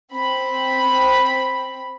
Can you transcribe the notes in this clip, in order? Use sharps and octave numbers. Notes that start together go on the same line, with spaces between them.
C4 B5